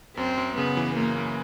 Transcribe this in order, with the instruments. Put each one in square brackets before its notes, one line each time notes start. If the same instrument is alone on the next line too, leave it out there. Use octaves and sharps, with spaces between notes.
[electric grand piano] F#2 [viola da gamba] C4
[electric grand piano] F#2
[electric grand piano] C#3 [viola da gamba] B3
[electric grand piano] E3
[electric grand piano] F#2 [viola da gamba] A#3
[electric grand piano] F#2